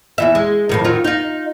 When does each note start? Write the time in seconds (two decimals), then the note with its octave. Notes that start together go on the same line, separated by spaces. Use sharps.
0.18 E2 E3 E5
0.35 G#3
0.69 F2 A2 D#3
0.84 D#3 F#3 F4
1.05 D#4 F4